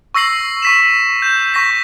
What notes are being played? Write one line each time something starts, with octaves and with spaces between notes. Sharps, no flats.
C#6 E6 A#6 C7 F#7
C#6 B6 E7
G6 E7
C#6 A#6 B6